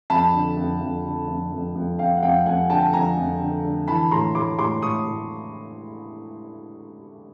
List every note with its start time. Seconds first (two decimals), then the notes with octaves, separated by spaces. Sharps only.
0.10 F2 A5 B5
0.34 D3
0.57 F2
0.81 F2
1.05 D3
1.28 F2
1.52 F2
1.75 F2
1.99 F2 F5 G5
2.17 F#5
2.23 F2 F5 G5
2.46 F2 F#5 G#5
2.70 D3 G5 A5
2.93 F2 G#5 A#5
3.17 F2
3.41 D3
3.64 D3
3.88 E3 A5 B5
4.11 A2 A#5 C6
4.35 A2 C6 D6
4.59 A2 C6 D6
4.82 A2 C#6 D#6
5.06 A2